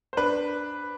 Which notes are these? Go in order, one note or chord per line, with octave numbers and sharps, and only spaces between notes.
C5
D4 B4